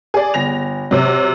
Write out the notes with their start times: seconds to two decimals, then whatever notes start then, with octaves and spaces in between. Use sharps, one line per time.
0.14 G#4 D5
0.34 G1 A#6 F7
0.91 C3 F#3